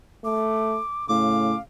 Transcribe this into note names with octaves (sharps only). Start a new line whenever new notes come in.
A3 D6
A2 C#3 F5 D6